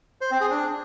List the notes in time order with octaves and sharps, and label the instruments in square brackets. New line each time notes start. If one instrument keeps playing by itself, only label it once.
[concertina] C5
C4
G#4
D4